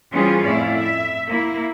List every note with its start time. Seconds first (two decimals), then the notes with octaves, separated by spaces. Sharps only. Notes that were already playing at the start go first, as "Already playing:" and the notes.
0.11 E3 G3 C#4 F4 G#4 C5
0.44 F2 A2 E4 D5 F5
0.78 E5
1.27 A#3 E4